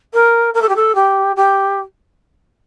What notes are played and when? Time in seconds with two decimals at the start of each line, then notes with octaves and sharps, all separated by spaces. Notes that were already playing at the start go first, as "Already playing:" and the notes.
0.14 A#4
0.54 A#4
0.62 A4
0.69 G4
0.76 A4
0.95 G4
1.36 G4